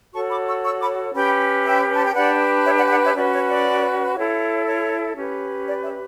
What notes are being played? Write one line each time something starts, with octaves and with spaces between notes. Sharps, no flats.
F#4 A4 C#5 A5 C#6
B5 D6
C#6 E6
C#6 E6
B5 D6
C#4 G4 B4 G5 B5
E5 G5
A5
G5
D4 G4 B4 D5 F#5
C#5 E5
D5 F#5
G5
D5 F#5
C#5 E5
C#4 F#4 B4 D5
C#5
D5
E4 A4 C#5
C#5
C#4 G4 B4
D5
C#5 E5